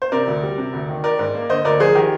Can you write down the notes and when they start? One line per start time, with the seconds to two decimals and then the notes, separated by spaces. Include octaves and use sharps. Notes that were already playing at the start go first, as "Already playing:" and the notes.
0.02 C5
0.12 C3 A#4 D5
0.27 D2
0.43 G3
0.58 C3
0.73 D2
0.89 D#3
1.04 D#3 A#4 D5
1.19 G#2
1.34 A#3
1.49 D3 C5 D#5
1.64 D2 A#4 D5
1.79 F3 G#4 C5
1.95 D#3 G4 A#4